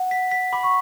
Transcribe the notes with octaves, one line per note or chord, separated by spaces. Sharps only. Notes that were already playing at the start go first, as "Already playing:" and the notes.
Already playing: F#5
B6
B6
B5 D6
C#6